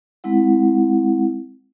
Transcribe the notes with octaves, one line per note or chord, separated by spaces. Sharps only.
G#3 C4 E4 F#5